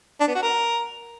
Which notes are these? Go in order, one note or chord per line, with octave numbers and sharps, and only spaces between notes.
D4
B3
F#4
A#4